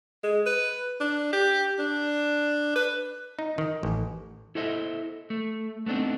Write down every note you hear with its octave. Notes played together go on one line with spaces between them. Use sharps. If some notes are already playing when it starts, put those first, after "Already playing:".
G#3
B4
D4
G4
D4
B4
D#4
D#3
A1
E4 A4 C5 D#5 E5
A3
A3 B3 C4 D4 D#4